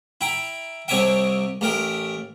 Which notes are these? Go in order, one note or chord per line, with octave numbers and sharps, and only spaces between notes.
E4 G5 A#5
C2 C3 C#5 D#5 E5 G5
A1 A3 A#4 G5